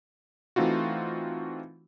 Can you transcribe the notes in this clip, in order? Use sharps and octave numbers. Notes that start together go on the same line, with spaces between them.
E3 A3 C4 D#4 F4 F#4